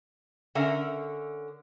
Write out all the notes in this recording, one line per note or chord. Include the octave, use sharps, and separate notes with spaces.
D3 C#4 A#4 E5